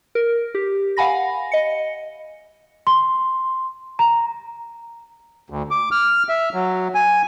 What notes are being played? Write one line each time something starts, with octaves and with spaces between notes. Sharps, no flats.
A#4
G4
F5 F#5 G#5 B5 A#6
D#5 C#7
C6
A#5
D2
D6
F6
E5
F#3
G#5